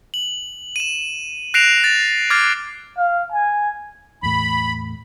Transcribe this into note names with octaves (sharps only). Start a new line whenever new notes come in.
F#7
D#7 E7
F#6 A#6 C7 D7 E7 F7
A6
D6 F6 G#6 A6 C7
F5
G#5
E2 A2 B5